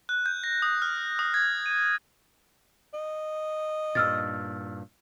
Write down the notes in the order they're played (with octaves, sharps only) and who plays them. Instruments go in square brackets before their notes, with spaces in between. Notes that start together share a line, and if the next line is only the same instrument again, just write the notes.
[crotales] F#6
G6
A#6
D#6
F6
D#6
G#6
D#7
[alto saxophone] D#5
[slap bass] G2 A#2 [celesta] E6 F6 A6